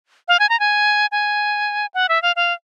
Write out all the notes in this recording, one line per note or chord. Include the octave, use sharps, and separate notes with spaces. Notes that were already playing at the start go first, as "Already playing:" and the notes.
F5
G#5
A#5
G#5
G#5
F#5
E5
F5
F5